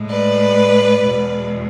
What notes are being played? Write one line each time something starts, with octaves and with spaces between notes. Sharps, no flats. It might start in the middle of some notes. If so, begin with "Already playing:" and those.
Already playing: A2 G#3
B4 D5
E2 B2 G#3